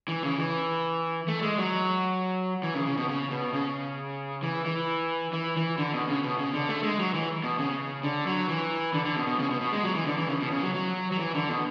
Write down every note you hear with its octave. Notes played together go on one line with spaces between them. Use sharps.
E3
C#3
E3
A3
G#3
F#3
E3
C#3
C#3
B2
C#3
B2
C#3
E3
E3
E3
E3
D3
B2
C#3
B2
C#3
D3
A3
G#3
F#3
E3
B2
C#3
D3
F#3
E3
D3
D3
B2
B2
C#3
B2
B2
G#3
F#3
E3
D3
E3
C#3
B2
C#3
F#3
F#3
F#3
E3
D3
B2